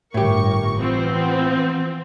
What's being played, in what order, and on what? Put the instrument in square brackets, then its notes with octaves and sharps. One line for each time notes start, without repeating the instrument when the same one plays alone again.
[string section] G1 A#4 C#6 [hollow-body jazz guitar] A2 G4
[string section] E3 F3 B3 [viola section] C4